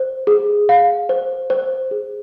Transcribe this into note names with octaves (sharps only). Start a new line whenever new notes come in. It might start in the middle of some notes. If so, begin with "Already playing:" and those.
Already playing: C5
G#4
F5
C5
C5
G#4